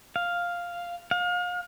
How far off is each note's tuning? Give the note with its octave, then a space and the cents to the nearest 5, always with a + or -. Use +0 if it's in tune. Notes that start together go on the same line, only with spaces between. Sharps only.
F5 +0
F5 +35